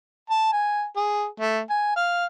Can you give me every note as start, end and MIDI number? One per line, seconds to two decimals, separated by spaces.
0.30 0.48 81
0.52 0.84 80
0.96 1.26 68
1.40 1.61 57
1.70 1.92 80
1.96 2.25 77